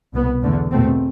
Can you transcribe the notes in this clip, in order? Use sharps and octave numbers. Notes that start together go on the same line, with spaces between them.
C2 B2 B3
E2 D3 A3
E2 B2 A3 C4